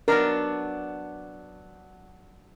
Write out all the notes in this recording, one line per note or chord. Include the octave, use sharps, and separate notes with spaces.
F#3 B3 D4 A#4